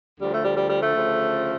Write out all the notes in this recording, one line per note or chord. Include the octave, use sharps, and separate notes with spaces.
D2 D3 F3 G3
A3
G3
G3
G3
A3
D2 C#3 F3